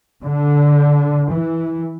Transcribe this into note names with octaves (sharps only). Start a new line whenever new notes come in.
D3
E3